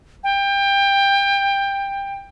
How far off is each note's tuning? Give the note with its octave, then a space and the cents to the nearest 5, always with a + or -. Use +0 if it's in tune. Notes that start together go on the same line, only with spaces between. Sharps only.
G5 +20